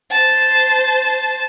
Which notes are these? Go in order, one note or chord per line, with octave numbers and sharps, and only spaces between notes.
C5 A5